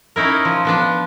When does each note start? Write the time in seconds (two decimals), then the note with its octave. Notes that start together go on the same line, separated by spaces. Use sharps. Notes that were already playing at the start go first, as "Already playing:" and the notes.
0.16 C#4 D#4 E4 A#4
0.45 F3
0.65 F3 B3 D4